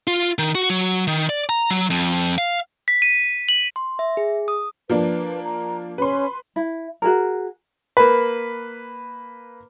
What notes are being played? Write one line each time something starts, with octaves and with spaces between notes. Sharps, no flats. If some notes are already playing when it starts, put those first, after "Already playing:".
F4
D#3
F#4
F#3
D#3
D5
A#5
F#3
F2
F5
B6
D#7
F#7
C6
E5
G#4
D#6
F3 A#3 D4 B4
A#5
C#4 B4 C6
E4
F#4 G#4 A#4
A#3 B4